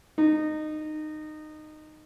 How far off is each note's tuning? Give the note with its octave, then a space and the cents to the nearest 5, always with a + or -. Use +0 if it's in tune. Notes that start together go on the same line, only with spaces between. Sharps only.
D#4 -20